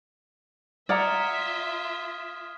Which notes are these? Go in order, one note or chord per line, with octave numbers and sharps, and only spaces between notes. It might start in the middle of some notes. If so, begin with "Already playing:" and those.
F4 D5 E5 F#5 A#5 D#6 F6 G#6